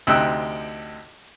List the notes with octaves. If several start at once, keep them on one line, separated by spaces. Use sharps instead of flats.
D2 C3 D#4 G5 E6 F#6